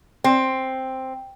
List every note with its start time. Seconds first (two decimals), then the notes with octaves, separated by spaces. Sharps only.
0.24 C4